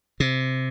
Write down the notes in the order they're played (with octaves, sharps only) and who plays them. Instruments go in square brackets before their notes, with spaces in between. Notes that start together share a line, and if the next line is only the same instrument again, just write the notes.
[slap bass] C3